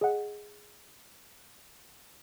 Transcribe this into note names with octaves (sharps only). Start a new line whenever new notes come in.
G#4 D#5 F#5